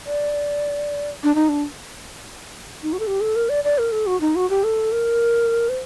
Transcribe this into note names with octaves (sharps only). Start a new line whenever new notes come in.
D5
D4
D#4
D4
D#4
F#4
A4
G4
A4
A#4
D5
D5
A#4
A4
F#4
D#4
F#4
G4
A4
A#4
C5